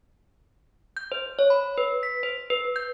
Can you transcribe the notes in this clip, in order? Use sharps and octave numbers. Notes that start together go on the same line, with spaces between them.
G6
C5
C#5
B5
B4
B6
C5
B4
G6